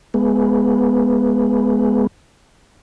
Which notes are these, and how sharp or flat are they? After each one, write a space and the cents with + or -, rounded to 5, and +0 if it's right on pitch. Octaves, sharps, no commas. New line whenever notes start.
G#3 +15 B3 +0